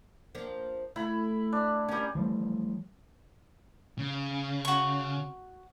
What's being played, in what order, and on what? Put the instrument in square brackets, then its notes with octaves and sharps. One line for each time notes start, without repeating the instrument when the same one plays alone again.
[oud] F3 A#3 D4
[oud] A3 [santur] E4 B5
[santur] D4
[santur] G3 G#5 [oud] C#4 A#4
[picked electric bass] E3 F3 G3 A3
[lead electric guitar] C#3
[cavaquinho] F#4 C#6